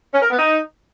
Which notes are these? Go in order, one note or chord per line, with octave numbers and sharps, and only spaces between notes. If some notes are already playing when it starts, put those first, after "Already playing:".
C#4
A#4
B3
D#4